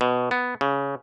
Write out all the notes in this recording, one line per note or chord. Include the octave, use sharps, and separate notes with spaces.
B2
B3
C#3